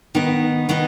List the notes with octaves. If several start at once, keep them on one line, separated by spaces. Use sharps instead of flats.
D#3 B3 D#4 B4
D#3 B3 D#4 B4